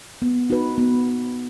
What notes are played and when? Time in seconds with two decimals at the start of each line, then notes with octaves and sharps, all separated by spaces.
0.22 B3
0.50 D#4 F#4 B4
0.78 B3